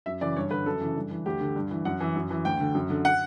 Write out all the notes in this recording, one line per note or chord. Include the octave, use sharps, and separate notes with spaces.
F#2 E5
C#3 E3 D5
G2 C#5
D3 B4
F#2 A4
C#3 E3
G2
E3
D2 G4
D3
G2
E3
F#2 F#5
E3
F#2
E3
D2 G5
D3
F#2
D3
F#5